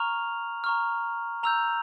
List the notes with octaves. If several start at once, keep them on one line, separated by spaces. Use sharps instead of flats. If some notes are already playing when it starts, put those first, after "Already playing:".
Already playing: A#5 C#6 F6 F7
A#5 C#6 F6
A#5 E6 G6 F7